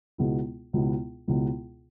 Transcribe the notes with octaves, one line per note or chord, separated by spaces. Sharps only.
C#2 B2 G#3 B3 E4
C#2 B2 G#3 B3 E4
C#2 B2 G#3 B3 E4